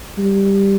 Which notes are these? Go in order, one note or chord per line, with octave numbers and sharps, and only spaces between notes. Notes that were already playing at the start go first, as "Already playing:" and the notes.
G3